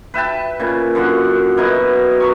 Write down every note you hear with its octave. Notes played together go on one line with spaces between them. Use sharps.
B4 E5 G5 A5
A#2 C#3
F#2 D3 F#5
B2 E4 A#4 D#5
F#3 A#4 C#6